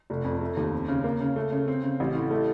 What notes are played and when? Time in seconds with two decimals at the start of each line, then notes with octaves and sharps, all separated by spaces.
0.10 F1
0.25 F2
0.41 A3
0.57 D#2
0.73 C4
0.89 C#3
1.04 A#3
1.21 C#3
1.36 A3
1.52 C#3
1.68 C4
1.83 C#3
2.00 A1
2.15 A2
2.31 A3